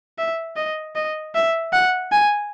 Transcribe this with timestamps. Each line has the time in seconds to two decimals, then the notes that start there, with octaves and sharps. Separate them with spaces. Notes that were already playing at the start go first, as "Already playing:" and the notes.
0.19 E5
0.57 D#5
0.96 D#5
1.35 E5
1.73 F#5
2.12 G#5